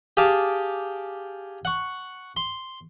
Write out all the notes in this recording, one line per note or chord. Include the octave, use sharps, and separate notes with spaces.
G4 G#4 F5 G#5 A5 D6
F#5 C#6
C6